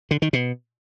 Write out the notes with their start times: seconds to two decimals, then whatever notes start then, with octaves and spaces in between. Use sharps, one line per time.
0.11 D3
0.22 D#3
0.33 B2